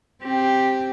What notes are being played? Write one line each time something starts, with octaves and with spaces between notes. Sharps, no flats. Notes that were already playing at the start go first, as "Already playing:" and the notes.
C4 G4